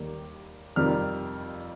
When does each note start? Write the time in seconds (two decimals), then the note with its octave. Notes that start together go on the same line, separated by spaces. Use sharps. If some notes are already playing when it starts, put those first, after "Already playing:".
Already playing: D#2 D#3 G3
0.76 F2 C3 D#3 G3 C4 F6